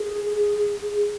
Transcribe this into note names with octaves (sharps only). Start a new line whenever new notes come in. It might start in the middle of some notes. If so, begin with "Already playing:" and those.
Already playing: G#4